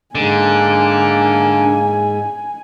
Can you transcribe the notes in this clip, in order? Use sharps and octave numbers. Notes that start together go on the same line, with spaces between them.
G#2 D3 A#3 G#5